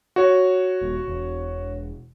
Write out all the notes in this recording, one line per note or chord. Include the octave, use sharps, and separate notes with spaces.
F#4 C#5
D#1
E1